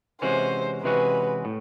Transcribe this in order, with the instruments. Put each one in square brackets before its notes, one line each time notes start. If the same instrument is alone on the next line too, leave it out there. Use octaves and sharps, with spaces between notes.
[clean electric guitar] C3 E3 G#3 C#4 F#4 [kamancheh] C5
[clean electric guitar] C3 E3 G#3 C#4 F#4 [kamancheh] B4
[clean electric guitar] A2